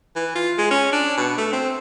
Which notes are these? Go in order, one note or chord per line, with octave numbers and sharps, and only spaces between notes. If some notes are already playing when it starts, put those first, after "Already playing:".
E3
F4
G#3
C#4
D4
B2
A3
C4